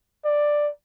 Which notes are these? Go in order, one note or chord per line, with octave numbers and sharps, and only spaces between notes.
D5